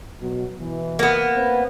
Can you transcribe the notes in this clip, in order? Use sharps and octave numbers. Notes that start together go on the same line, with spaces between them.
B2 F#3
B2 E3
A#3 B3
C4 B4